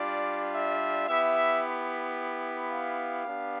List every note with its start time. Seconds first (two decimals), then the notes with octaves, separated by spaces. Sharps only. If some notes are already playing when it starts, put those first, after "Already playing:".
Already playing: G3 D4 F4 D5
0.53 E5
1.07 B3 E4 G4 E5
2.70 F5
3.25 B3 D4 G4